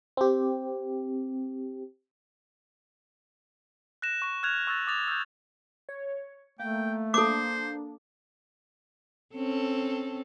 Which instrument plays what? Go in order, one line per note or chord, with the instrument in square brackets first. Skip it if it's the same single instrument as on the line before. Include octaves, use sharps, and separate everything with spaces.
[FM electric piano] C4 G4
[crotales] F#6 A#6 E7
C#6 E7
F6 F#6 G#6 F7
C#6 E6 F#6 A6
D6 D#6 A6 F7
E6 G6
[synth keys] C#5
[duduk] A3 [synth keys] A#3 [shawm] G5
[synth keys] A#3 D4 [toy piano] A4 D6 [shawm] C5
[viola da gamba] C4 C#4 A4